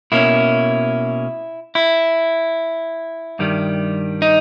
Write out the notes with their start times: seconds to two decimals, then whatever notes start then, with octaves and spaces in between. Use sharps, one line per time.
0.12 B2 A#3 C#4 E4
1.75 E4
3.39 G2 D#3 G3
4.22 D#4